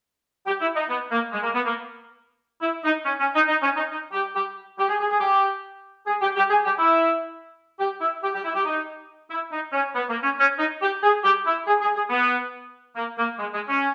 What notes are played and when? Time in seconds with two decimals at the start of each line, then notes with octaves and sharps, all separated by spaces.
0.47 G4
0.61 E4
0.76 D#4
0.89 B3
1.12 A#3
1.33 G#3
1.43 A#3
1.55 B3
1.66 A#3
2.62 E4
2.84 D#4
3.06 C#4
3.20 C#4
3.34 D#4
3.48 D#4
3.63 C#4
3.77 D#4
3.91 D#4
4.12 G4
4.35 G4
4.78 G4
4.89 G#4
5.00 G#4
5.10 G#4
5.20 G4
6.07 G#4
6.22 G4
6.36 G4
6.50 G#4
6.65 G4
6.79 E4
7.79 G4
8.01 E4
8.23 G4
8.34 G4
8.44 E4
8.55 G4
8.65 D#4
9.31 E4
9.52 D#4
9.73 C#4
9.95 B3
10.10 A#3
10.23 C#4
10.39 C#4
10.59 D#4
10.82 G4
11.03 G#4
11.24 G4
11.46 E4
11.67 G#4
11.82 G#4
11.96 G#4
12.10 B3
12.96 A#3
13.18 A#3
13.39 G#3
13.54 G#3
13.69 C#4